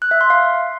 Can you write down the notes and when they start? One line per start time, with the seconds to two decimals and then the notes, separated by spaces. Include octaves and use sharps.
0.02 F#6
0.11 E5
0.21 C6
0.30 F5